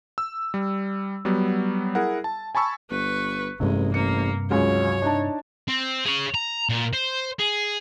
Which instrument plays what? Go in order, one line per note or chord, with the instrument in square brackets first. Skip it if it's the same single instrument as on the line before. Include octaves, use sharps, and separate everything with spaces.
[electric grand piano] E6
G3
F#3 G3 B3
E4 G#4 A#4 F#5
A5
G#5 A5 B5 C#6 E6
[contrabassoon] G1 [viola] B4 C#6
[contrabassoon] A1 [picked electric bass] G2 C3 [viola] G#3
[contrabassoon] A1 [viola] A#3 [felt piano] C#7
[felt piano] C#2 C#3 [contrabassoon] F#3 [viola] C#5
[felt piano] D4 D#4 A5
[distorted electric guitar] C4
G#4 C#5
A#5
A#2
C5
G#4